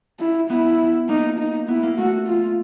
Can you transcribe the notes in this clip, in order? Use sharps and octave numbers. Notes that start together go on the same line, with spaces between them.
E4
B3 E4
A#3 D#4
D#4
B3 E4
A#3
A3 F#4
F4